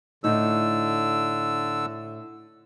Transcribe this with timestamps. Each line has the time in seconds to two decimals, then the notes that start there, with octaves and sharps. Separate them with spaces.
0.24 A2 D3 D#4 E6